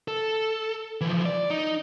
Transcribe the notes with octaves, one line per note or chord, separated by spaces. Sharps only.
A4
E3 F3
D5
D#4